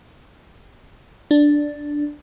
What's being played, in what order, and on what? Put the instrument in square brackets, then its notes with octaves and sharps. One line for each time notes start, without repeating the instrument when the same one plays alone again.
[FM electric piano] D4